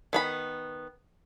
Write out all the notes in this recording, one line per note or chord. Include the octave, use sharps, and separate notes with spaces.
D#3 B3 B5